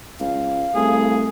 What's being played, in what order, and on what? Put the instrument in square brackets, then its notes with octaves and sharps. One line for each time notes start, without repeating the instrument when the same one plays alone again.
[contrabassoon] C#2 [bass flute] F5
[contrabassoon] C2 [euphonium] A3 [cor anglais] G#4